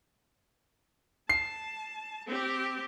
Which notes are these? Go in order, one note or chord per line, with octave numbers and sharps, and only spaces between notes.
A5 C7
C4 G4